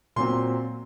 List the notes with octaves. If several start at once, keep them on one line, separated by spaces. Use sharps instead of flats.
A#2 F#3 C4 C6